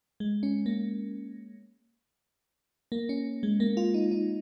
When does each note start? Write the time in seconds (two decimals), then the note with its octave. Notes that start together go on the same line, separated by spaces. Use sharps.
0.20 G#3
0.43 C#4
0.66 A#3
2.92 A#3
3.09 C#4
3.43 G#3
3.60 A#3
3.77 F4
3.94 D#4
4.11 D#4